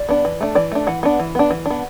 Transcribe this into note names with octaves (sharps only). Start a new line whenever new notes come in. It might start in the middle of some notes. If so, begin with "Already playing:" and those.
Already playing: D5
B3 D4
E3
A3 D4
E3 D5
A3 D4
E3 F#5
B3 D4
E3
B3 D4
E3
B3 D4